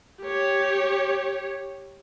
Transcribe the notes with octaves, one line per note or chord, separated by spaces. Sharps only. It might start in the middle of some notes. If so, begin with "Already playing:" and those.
G4 C#5